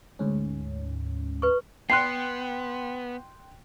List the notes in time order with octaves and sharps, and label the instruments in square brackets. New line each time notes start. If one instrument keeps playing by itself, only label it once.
[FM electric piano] D2 G#2 C#4
[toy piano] B4 C#6
[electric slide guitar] B3 [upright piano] G5 C6 F#6 [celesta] C7